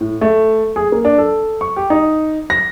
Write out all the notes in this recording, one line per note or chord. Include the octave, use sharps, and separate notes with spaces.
A2
A3
G#4
A#3
D4
A4
C#6
G4
D#4
A#6